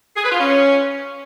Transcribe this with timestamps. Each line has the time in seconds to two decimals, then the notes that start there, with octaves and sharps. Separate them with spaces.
0.16 G#4
0.24 B4
0.32 F4
0.39 C#4